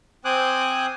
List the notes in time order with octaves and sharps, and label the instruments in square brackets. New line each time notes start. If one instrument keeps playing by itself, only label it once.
[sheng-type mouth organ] C4 C5 G#5 D6 D#6 F#6